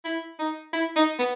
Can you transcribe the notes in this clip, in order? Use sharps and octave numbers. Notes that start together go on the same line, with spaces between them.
E4
D#4
E4
D#4
B3